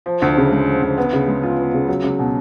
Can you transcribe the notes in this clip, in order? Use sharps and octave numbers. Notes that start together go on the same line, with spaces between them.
F3
D2
C#3
G#3
F3
D2
B3
C#3
G#3
F4
B3
C#3
F#3
C#2
B2